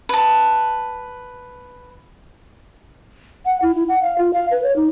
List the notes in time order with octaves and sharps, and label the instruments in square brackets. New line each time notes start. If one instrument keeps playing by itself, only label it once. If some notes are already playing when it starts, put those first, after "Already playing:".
[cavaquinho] B4 A5
[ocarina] F#5
E4
E4
F#5
F5
F4
F5
B4
C#5
D#4